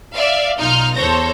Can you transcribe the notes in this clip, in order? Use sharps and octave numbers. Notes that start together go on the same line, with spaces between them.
D5 E5 F5
B1 D#4 F4 F6 G6
E2 A4 C5 C#5 G6 A#6